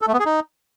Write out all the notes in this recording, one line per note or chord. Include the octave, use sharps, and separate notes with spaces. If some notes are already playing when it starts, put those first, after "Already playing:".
A4
A3
B3
G#4
D#4